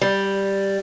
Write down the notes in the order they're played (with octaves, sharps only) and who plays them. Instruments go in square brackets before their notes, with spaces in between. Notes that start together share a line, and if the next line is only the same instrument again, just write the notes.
[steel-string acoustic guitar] G3